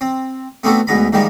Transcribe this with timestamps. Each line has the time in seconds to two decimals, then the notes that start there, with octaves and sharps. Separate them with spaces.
0.01 C4
0.63 A3 B3 C4 D4 F#4 A4
0.87 D2 G#2 B3 A#5 B5
1.13 G#2 D#3 F3 G3 A#3